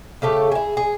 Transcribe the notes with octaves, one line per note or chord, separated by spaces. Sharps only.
C#3 A3 G4 A4
E4 G#4
G#4